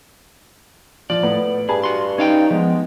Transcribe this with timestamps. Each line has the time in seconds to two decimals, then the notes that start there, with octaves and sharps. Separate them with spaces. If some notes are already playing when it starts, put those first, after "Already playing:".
1.10 F3 D5
1.23 A2 B3
1.69 G2 G#4 G#5 A5 B5
1.84 F#4 C6
2.18 C#4 D#4 F5 G5
2.51 F3 G#3 B3